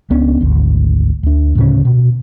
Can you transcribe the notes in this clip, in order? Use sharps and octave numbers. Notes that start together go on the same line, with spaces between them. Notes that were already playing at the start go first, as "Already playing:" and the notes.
C#2 B3 C#4 D4
G#1 D2
D2 D4
D2 A2 C#3 C#4
B2